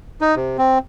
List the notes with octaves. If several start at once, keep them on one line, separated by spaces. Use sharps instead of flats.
D#4
C3
C4